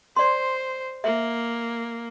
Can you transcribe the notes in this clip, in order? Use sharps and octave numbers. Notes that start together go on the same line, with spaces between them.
C5 D5 C6
A#3 E5